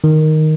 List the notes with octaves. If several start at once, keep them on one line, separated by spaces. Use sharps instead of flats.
D#3